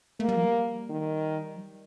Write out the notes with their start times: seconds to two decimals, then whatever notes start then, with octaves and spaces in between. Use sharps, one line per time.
0.20 A3 A#3
0.29 G3
0.36 F3
0.45 G3
0.90 D#3
1.56 F3
1.60 G3